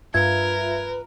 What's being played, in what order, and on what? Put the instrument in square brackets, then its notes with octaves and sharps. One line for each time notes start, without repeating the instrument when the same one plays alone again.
[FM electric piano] G2 F4 E5 [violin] A#4 [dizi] B4 [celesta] G#6